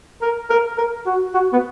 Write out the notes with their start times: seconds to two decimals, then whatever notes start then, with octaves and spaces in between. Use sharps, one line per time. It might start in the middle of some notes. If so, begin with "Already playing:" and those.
0.22 A#4
0.50 A#4
0.78 A#4
1.06 F#4
1.34 F#4
1.53 B3